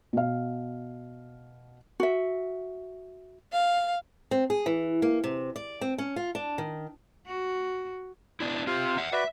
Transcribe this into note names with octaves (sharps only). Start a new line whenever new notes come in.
B2 F5
F#4 E5
F5
C4
G#4
E3
A#3
C3
D5
C4
C#4
F4
D4
D#3
F#4
B3 D4 E4
C4 F4 G4 F5
E5 F#5
F#4 B4 D5 E5